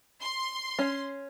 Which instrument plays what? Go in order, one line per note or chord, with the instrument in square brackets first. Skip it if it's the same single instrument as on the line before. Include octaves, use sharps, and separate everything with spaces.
[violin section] C6
[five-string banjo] C#4